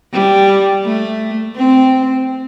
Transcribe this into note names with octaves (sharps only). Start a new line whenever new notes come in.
G3
A3
C4